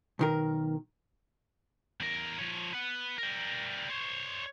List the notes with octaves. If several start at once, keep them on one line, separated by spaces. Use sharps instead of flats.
B1 D#3 A#4
E2 A#4
F3 C#5
B4 F#5
G3 A#4
C5 C#5